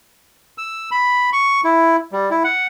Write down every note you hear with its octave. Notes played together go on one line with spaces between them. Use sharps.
E6
B5
C#6
E4
G3
E4
F#5